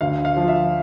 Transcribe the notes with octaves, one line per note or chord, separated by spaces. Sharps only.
D2 F5
F5
F3
E5